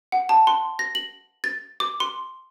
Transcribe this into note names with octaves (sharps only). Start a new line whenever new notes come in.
F#5
A5
C6
A#6
F#7
A6
D6
C6